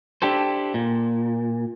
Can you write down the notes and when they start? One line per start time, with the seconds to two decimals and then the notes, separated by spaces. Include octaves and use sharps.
0.22 D4 E4 G4 A4 C5
0.74 A#2